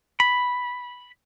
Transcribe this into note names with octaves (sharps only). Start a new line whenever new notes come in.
B5